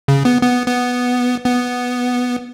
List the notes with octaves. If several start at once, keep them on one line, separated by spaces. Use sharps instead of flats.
C#3
B3
B3
B3
B3